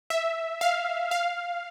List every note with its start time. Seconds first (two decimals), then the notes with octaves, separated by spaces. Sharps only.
0.10 E5
0.61 F5
1.11 F5